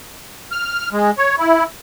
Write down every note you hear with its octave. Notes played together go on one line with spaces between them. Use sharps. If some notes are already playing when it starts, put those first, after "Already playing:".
F6
G#3
C#5
E4